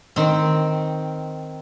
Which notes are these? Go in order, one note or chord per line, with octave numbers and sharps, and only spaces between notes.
D#3 C4